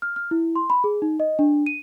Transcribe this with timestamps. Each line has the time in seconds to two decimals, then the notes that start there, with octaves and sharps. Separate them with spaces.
0.02 F6
0.16 F6
0.31 E4
0.56 C6
0.70 B5
0.84 G#4
1.02 D#4
1.20 D#5
1.39 D4
1.66 D#7